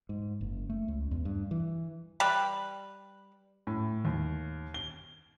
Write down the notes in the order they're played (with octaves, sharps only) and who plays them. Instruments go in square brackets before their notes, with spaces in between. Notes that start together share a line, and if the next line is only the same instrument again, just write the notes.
[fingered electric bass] G#2
F#1
A3
C#2
E2
G2
E3
[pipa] G3 G4 B4
[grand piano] A2
D#2
G7